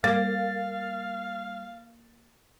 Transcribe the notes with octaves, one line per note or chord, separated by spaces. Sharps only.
G3 A#3 F5 A6